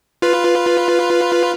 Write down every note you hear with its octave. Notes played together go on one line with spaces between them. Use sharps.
F4 B4